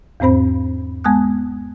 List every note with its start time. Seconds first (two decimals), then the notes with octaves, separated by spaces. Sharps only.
0.20 E2 G#2 C4 C5 B5
1.04 G#3 B3 G#5 A5 D#6 F#6